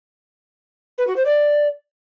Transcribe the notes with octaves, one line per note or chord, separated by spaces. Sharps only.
B4
F#4
C5
D5